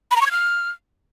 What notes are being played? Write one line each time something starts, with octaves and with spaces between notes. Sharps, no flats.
B5
A#5
C#6
G#6
F6